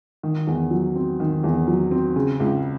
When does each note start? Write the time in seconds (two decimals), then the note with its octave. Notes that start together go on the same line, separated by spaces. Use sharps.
0.23 D#3
0.47 E2
0.71 F#3
0.96 C4
1.20 D#3
1.44 E2
1.67 F#3
1.91 C4
2.16 C#3
2.40 C#2